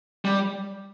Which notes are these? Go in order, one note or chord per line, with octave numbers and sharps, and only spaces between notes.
G3